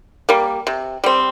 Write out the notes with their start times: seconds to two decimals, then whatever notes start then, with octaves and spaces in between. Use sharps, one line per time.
0.29 G3 A#3
0.67 C3
1.04 G3 C4